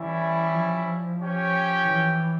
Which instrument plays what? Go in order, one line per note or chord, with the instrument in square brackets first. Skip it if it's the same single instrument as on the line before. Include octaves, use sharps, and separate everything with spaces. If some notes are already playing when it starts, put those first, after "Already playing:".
Already playing: [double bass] E3 [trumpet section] G3 C#4 E4
[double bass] F3
[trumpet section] C#4 G4 C#5 G5
[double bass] E3